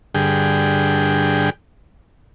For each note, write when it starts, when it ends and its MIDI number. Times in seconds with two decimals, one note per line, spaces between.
0.15 1.50 43
0.15 1.50 50
0.15 1.50 68
0.15 1.50 79